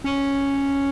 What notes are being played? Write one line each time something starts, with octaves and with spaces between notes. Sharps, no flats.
C#4